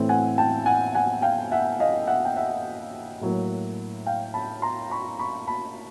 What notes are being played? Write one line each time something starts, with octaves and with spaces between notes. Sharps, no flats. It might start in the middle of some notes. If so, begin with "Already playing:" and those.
Already playing: A2 E3 A3 C4
F#5 G#5
G5 A5
F#5 G#5
F#5 G#5
F5 G5
E5 F#5
D#5 F5
E5 F#5
G5
E5 F#5
A2 F#3 A#3
F5 G5
A5 B5
A#5 C6
B5 C#6
B5 C#6
A5 B5